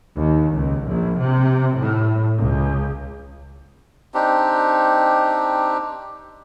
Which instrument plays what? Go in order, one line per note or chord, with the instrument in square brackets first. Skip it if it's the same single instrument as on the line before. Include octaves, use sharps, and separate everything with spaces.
[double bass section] D#2
C#2
A#1
C3
A2
C#2
[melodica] C4 D4 D#4 G4